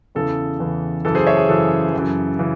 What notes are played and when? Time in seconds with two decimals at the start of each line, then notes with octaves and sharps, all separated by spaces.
0.15 E2 C#3 E3 A4
0.60 E2 C#3 E3
1.05 F#2 C#3 E3 A4
1.15 G#4 C5
1.27 C#5 E5
1.37 G#4
1.48 F#2 C#3 E3 A4
1.93 F#2 C#3 E3
2.39 C#3 E3